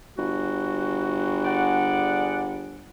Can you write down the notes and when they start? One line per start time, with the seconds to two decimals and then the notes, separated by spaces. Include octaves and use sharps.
0.18 G1 F#4
1.45 G#4 D5 F#5